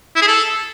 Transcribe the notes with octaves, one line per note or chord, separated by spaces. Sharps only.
E4
G#4
A4